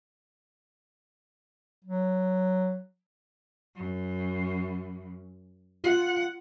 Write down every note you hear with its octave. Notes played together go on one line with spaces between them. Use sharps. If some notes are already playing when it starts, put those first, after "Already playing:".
F#3
F#2
F4 F#5